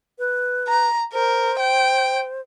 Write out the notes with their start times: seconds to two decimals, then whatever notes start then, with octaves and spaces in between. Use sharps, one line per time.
0.19 B4
0.68 A#5
1.13 A#4 C5
1.59 G5